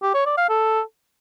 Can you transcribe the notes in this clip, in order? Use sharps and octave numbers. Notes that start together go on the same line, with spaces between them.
G4
C#5
D5
F5
A4